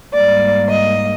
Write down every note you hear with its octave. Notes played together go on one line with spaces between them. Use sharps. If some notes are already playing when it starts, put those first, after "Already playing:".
G#2 G3 A#3 D5
D#5